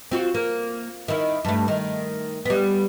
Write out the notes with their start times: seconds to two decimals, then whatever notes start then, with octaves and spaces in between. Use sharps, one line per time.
0.11 C4 F4 F#4
0.34 A#3
1.08 D#3 E4
1.45 G2 A3
1.68 D#3
2.45 G3 B3